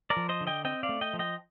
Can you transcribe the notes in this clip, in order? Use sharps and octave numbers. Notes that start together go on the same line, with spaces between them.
A#4 D5
F3
C5 D#5
D3
D#5 G5
C4 D#5 G5
D5 F5
A3
D#5 G5
F3
D#5 G5